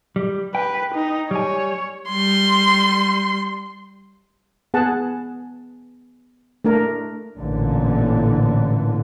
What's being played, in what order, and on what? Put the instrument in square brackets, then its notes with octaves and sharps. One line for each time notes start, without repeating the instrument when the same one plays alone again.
[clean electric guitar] G3
[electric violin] B4 [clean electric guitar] G5
[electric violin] D#4
[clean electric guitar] G3 G#5 [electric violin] C#5
[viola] G3 C6
[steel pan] B3 G#4 F#5 A5
A3 D4 A#4
[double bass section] A1 A#2 D3 E3